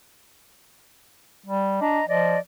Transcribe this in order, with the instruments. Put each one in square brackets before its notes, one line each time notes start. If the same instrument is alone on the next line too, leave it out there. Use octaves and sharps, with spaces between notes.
[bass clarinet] G3
[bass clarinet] D4 [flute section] D#5 A#5
[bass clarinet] F3 [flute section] D5 D#5